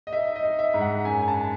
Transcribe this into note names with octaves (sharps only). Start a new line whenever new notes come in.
D#5
D#4 E5
D#5
D#4
E5
G#2
F#5
F#2 G#5
G#5
A5